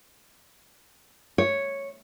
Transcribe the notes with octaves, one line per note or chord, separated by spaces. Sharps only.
C#5